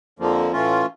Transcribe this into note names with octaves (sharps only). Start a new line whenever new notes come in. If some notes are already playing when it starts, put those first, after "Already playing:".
F2 D3 F3 A#3
A2 E3 A3 C#4 F4